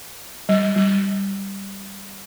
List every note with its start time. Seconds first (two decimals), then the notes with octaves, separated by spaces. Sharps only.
0.49 G3
0.76 G3